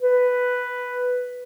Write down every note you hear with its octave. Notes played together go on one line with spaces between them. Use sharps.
B4